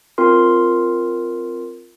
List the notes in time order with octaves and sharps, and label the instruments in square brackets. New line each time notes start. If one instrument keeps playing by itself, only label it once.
[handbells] C4 F4 A#4 C6